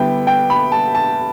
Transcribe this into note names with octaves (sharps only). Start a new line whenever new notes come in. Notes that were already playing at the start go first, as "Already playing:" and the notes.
Already playing: D3 G3 B3 E4 G5
G5
B5
A5
A5